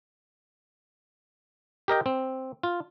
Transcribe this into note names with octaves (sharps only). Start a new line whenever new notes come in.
G4 A#4 D#5 G5
C4
F4